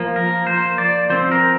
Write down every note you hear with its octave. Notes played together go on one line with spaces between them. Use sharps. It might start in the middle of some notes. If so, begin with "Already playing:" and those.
Already playing: F3 A#3
A#4
C5
D5
F3 C4 C5
A#4